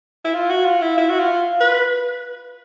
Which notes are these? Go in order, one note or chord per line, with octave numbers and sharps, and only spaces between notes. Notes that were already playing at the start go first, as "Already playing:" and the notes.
E4
F4
F#4
F4
E4
E4
F#4
F4
B4